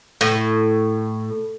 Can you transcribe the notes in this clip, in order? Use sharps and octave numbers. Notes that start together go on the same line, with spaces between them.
A2